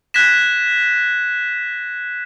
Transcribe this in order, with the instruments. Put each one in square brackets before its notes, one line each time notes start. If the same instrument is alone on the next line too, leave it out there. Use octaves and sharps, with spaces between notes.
[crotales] F#6 G#6 A#6 B6 E7